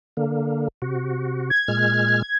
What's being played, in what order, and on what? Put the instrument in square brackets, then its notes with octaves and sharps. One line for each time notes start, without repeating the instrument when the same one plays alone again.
[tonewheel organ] D3 A#3
C3 F#4
[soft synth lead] G#6
[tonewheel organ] A#2 G#3 F6